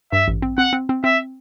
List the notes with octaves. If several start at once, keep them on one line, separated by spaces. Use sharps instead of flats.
G2 E5
A1
C4
C4 F#5
C4
C4
C4 E5